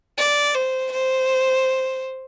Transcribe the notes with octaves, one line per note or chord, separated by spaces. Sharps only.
D5
C5
C5